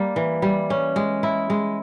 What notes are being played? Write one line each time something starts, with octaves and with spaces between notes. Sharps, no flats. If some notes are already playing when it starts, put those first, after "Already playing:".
Already playing: G3 A#3
E3
G3
C#4
G#3
E4
G#3